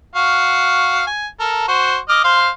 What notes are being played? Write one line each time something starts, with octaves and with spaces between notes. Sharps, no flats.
F#4 F5
G#5
A4 A#4
F#4 C5
D#5 D6 F6
C5 F5 C6